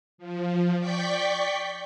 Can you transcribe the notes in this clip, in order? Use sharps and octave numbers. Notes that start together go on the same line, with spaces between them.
F3
D5 G5 C#6 G6 B6